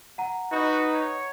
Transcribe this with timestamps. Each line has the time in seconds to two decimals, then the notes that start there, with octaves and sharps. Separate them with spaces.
0.18 F#5 A#5
0.52 D#4 F#4 B4
0.94 C#5